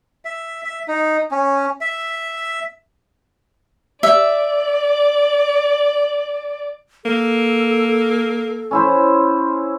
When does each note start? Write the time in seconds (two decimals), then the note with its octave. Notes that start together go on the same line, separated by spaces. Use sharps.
0.25 E5
0.64 E5
0.88 D#4
1.31 C#4
1.81 E5
4.03 D5 E5
7.05 A#3 A4
8.71 C#4 E4 C5